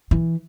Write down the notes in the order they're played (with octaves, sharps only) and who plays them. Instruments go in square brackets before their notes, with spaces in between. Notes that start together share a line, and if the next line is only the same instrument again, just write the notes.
[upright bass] E3